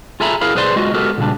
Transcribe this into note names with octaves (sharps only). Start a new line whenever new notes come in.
F4 G#4 A4 E5 A#5 B5
E4 G#4 A#4 F5 B5
B1 G#4 B4 C5 D5 C6
G#3 F4 F#4 D#5
G#3 B3 F#4 G4 A4 A#4
A#2 C#3 G3 D4